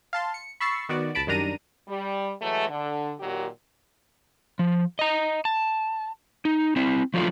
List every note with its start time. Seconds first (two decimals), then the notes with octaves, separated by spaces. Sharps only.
0.13 F5 A5 C6
0.34 C#7
0.60 B5 C#6 E6 A6 C7 C#7
0.89 D#3 B3 F#4 D5
1.15 C#2 A5 B5 D7
1.27 F#2 D#3 G3 D4 A#5 D#7
1.88 G3
2.41 E3 F#3 G#3 A3
2.69 D3
3.20 A#2 D#3 F#3 G4
4.59 F3
4.99 D#5 A#5
5.45 A5
6.45 D#4
6.76 C4 E4
7.14 F3 F#3 A3 D4 F4